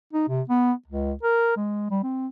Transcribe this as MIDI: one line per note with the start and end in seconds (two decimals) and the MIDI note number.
0.13 0.25 63
0.28 0.42 48
0.49 0.72 59
0.88 1.13 37
1.23 1.56 70
1.56 1.88 56
1.91 1.99 55
2.03 2.27 60